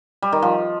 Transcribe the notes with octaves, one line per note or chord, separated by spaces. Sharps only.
G3
D#3
F3